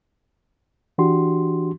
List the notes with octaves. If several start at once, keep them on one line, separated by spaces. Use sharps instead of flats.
E3 D4 F#4 G4 C6